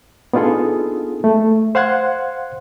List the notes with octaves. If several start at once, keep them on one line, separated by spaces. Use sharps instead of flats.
B3 D4 D#4 F4 G#4 A4
A3
C5 F5 F#5 C6 F#6 G#6